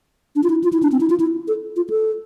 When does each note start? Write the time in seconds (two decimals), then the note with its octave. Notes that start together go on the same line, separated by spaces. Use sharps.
0.36 D4
0.43 F4
0.50 E4
0.64 F4
0.73 E4
0.83 D4
0.92 C4
1.01 E4
1.10 F4
1.20 E4
1.48 A4
1.76 F4
1.90 A4